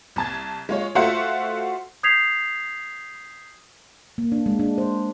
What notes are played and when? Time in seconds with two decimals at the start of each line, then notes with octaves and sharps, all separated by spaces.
0.16 C2 A5 G#6
0.69 G#3 F4 C#5
0.95 A3 F4 F#4 C5 E5 F#5
2.03 D#6 G6 G#6 B6 C7 F7
4.18 A#3
4.32 D4
4.46 G#3
4.60 D4
4.78 C5